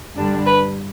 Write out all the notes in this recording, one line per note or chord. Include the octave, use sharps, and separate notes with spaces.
G2 D3 G3 D4
B4